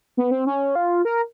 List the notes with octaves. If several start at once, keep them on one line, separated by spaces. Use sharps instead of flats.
B3
C4
C#4
F4
A#4